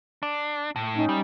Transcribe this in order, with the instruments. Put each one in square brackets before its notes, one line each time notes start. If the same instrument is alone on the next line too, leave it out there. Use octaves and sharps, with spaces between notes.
[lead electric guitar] D4
A2
[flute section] C#4 D#4
[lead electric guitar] G3